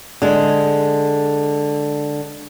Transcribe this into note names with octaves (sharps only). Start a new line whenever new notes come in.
D3 G#3